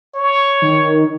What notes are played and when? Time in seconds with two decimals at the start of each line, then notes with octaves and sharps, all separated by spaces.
0.15 C#5
0.62 D#3